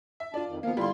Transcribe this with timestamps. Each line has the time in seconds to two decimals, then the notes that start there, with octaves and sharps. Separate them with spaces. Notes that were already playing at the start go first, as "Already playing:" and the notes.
0.20 E5
0.34 D4 F4 D5 A5
0.47 F2 D#3
0.63 D#3 F3 A#3 B3 F5
0.77 D3 G3 E4 F4 C6